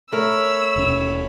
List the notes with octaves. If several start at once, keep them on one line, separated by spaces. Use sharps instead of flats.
A3 A#4 C#5 B5 E6
D#1 B2 C#4